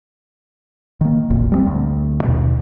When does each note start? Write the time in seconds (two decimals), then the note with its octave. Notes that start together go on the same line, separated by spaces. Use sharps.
1.01 D#3 A#3
1.30 E1 A#1 F2 A#2
1.52 G3 G#3 C4
1.67 D2
2.24 D#2 B2